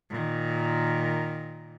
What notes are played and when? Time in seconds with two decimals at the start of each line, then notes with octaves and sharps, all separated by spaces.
0.10 A#2 D#3